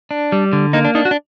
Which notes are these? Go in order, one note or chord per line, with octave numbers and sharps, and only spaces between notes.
D4
G3
D3
A#3 D#4
D4
D4 D#4
F#4
D4